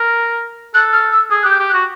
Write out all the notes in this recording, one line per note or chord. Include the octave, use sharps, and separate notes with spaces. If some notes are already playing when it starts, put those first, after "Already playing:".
Already playing: A#4
A4 F#6
F6
E6
G#4 D#6
G4 F#6
G6
G4
F#6
F#4